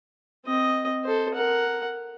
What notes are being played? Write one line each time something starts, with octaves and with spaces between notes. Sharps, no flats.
C4 D#5
A4 C5
A#4 F#5